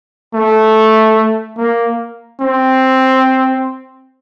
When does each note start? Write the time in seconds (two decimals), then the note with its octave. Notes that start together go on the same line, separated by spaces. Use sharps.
0.34 A3
1.58 A#3
2.41 C4